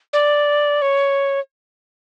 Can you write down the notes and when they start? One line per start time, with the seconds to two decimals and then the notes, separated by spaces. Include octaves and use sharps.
0.13 D5
0.82 C#5